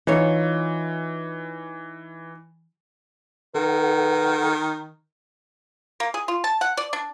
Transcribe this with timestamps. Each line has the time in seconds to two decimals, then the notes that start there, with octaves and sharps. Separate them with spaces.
0.07 E3 D#4 F4 C#5
3.55 D#3 A4 B4 F#5
6.00 A#3
6.14 G#4
6.28 F4
6.44 A5
6.61 F#5
6.77 D5
6.93 D4